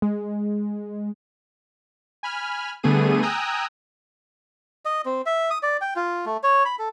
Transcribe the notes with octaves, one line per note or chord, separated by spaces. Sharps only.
G#3
G#5 B5 F6
D3 G3 A3 B3 G#4 D#7
G5 G#5 A#5 D#6 E6 F#6
D#5
C4
E5
D#6
D5
G5
F4
A3
C#5
B5
A4